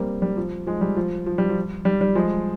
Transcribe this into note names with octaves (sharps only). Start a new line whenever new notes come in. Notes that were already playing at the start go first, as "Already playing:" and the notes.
Already playing: G3 A#3 C4
G3
F3
F3 G#3
G3
F3
F3
G3
F3
G3
G3
F3 G#3